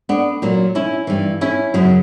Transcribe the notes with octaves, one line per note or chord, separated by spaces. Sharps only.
B3 D4
A#2 F#3
C#4 E4
G2 E3
C#4 E4
F#2 C#3 F#3